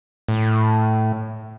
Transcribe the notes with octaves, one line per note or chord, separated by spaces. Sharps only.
A2